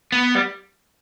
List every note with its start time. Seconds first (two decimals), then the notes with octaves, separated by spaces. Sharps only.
0.12 B3
0.35 G3